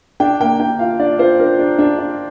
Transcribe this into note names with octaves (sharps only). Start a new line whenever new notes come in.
D4 G5
A#3 G5
D4 G5
F4 F5
D4 D5
F4 C5
D4 A#4
D4
D4
D4